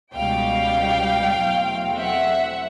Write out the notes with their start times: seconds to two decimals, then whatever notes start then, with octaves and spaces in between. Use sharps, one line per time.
0.15 C#2 B2 G3 F5 G5
1.37 E2 B2 F#3 A3 C4
1.99 E5 F#5